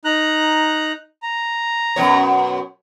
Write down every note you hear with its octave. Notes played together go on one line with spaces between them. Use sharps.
D#4 A#5 F#6
A#5
F#2 B2 C#5